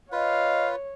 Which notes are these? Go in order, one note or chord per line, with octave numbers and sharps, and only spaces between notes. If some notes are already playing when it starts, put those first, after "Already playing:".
F4 B4 C#5 D#5 F5